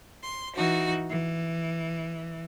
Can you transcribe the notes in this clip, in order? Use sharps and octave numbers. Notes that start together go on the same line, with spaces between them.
C6
E3 D#4 F#4
E3